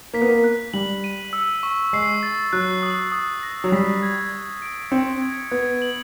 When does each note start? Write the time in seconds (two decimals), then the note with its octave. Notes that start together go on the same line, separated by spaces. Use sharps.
0.14 A#3 B6
0.21 B3
0.29 A#3
0.44 F#6
0.73 G3 F#7
1.04 D#7
1.33 E6
1.63 C#6
1.93 G#3 C7
2.23 A6
2.53 F#3 F#6
2.83 D#6
3.12 D#6
3.43 A#6
3.64 F#3
3.72 G3 B6
4.03 G#6
4.31 G#6
4.62 D7
4.91 C4 C#7
5.22 G#6
5.51 B3 G#6
5.82 F#7